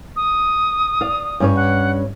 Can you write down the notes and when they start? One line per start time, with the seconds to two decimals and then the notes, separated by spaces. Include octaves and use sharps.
0.16 D#6
1.01 D5 F5
1.40 G2 C#4 C#5
1.56 F#5